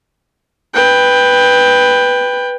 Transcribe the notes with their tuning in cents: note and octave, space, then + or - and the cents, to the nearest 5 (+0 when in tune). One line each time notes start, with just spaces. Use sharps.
B4 +0 G5 +20